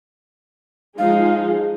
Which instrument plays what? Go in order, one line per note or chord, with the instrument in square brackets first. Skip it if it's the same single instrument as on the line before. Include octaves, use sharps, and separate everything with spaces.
[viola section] F3 G#3 D#4 G#4 [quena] F5